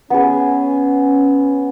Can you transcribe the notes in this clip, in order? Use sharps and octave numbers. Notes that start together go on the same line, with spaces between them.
B3 C#4 G#4